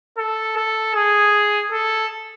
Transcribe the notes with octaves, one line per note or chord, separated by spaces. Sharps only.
A4
A4
G#4
A4